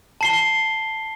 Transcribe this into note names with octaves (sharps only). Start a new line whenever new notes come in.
A5 C7 G7